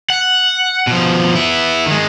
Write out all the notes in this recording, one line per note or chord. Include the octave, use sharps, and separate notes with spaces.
F#5
B2 F3
B3 E4
D#3 G#3